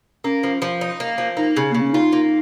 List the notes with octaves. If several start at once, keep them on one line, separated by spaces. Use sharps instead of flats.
A#3 C#4
F3
F3
D#4
A#3
F3
A#3 D#4
C#3
C#3 A#3
C#4
D#4 F4
A#3